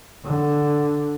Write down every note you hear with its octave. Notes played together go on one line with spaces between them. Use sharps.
D3